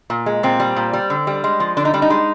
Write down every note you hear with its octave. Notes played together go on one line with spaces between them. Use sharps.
A#2
G#3
A#2 C4
G3
A#2
G3
D3
G3
G#3
F3
D3 D4
D#4
G3 D4
D#4
G#3